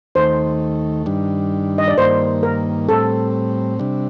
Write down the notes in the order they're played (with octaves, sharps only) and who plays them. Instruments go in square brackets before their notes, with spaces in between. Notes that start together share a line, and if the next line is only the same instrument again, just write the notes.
[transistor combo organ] D#2 D#3 A3 [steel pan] C5
[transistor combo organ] G2 D#3 G3 D4
[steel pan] D#5
D5
[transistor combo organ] G2 D#3 A#3 [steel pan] C5
[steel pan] A#4
[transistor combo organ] A2 G3 C4 [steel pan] A4
[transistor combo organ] C3 G3 D4